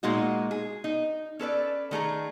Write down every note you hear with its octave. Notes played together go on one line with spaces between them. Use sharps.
A#2 G#3 A#3 D#4 F#4
G#4
D#4
C#4 A4 B4 D5
D#3 A3 G#4 A#5